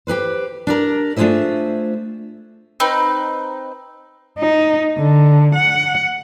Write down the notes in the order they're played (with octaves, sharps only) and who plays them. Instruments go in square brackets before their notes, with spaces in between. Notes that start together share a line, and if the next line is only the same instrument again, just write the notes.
[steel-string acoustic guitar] G4 G#4 B4 C5
D4 G4 A#4
A3 D4 F4 G#4 C5 E5
[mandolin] C4 D#4 B4
[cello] D#4
D3
F#5